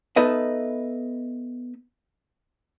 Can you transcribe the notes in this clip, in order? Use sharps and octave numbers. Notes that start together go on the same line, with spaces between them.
B3 D#4 A4 B4 D#5 E5